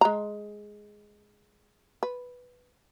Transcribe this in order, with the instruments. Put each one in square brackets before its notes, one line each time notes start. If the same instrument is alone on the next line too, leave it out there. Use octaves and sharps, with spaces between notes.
[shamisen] G#3 A#5
B4